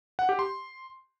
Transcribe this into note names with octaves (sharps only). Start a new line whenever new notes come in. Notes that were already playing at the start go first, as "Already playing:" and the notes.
F#5
G4
C6